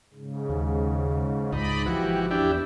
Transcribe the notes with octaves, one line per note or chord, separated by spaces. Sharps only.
G#2 C#3
D#2
C#2 G#2 D#4 D5 D#5 B5
G#1 C#2 E3 F3 F#4 G4
E2 D4 E4 G4